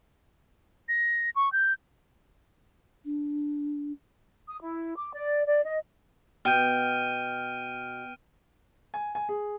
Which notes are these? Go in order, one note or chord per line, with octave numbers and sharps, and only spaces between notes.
A#6
C#6
G6
D4
D#6
E4
D6
D5
D5
D#5
B2 G5 F6 G6 D7 D#7
G#5
G#5
G#4